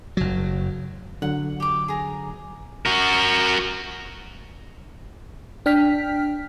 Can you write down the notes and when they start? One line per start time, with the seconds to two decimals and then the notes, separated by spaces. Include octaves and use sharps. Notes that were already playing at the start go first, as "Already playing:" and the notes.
0.17 F#1 F#3
1.22 D3 F#3 F#5
1.60 G4 D6
1.88 G#4 A#5
2.86 F#4 A#4
5.66 D4 G5 F6 B6